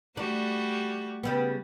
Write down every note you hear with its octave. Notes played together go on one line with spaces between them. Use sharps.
G3 A3 D4 F#4
C#3 G3 B3